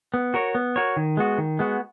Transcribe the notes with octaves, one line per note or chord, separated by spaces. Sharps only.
B3
F#4 A#4 C#5
B3
F#4 A#4 C#5
D#3
G#3 B3 F#4
D#3
G#3 B3 F#4